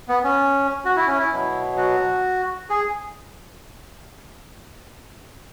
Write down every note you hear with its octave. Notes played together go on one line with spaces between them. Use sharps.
B3
C#4
F#4
E4
C#4
E4
B2 F#3
F#4
G#4